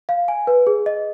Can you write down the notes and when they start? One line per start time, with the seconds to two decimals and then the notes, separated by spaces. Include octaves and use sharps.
0.09 F5
0.28 G#5
0.47 B4
0.67 G#4
0.86 D#5